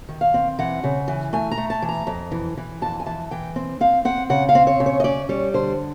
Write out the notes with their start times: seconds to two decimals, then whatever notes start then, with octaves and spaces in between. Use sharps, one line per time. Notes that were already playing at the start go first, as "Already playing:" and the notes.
0.09 D#3
0.21 F5
0.34 C4
0.59 E3 F#5
0.84 C#3
1.08 E3
1.33 A3 G#5
1.51 A#5
1.57 A3
1.70 A5
1.82 E3
1.89 A#5
2.07 F2
2.32 E3
2.57 E3
2.82 F2 A5
3.00 G#5
3.06 E3 A5
3.31 E3 G5
3.56 C4
3.80 C4 F5
4.05 C4 F#5
4.30 C#3 F#5
4.49 F5
4.55 C4
4.67 C#5
4.80 C#3
4.86 C#5
5.00 D#5
5.04 C#4 D5
5.29 G3 C#5
5.54 D3 C5